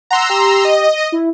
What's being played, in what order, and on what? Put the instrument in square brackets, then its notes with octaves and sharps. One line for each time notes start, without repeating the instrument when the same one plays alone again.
[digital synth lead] F#5 [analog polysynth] A#5 C6 E6
[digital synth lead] G4
[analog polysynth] D#5
[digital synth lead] E4